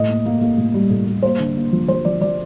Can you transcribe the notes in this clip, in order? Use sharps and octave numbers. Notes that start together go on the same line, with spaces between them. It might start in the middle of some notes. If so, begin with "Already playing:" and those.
Already playing: A2 D#5
A#3
A#3
A#3
A2
G3
A2
G3
A#3 C5
D3
A#3
F3
F3 C5
F3 D5
F3 D5